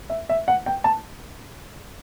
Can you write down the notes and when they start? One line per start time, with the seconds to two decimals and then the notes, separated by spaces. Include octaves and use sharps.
0.10 E5
0.29 E5
0.48 F#5
0.66 G5
0.84 A5